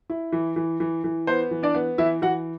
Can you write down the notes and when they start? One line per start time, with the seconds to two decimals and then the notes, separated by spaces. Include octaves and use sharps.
0.10 E4
0.32 E3
0.56 E3
0.80 E3
1.04 E3
1.27 B3 C5
1.51 E3
1.63 D4 D5
1.74 B3
1.98 E3 E4 E5
2.22 E3 F#4 F#5